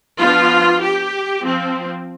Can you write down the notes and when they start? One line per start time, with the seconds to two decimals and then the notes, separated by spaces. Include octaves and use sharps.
0.19 F3 B3 D4 F4
0.81 G4
1.43 F3 C4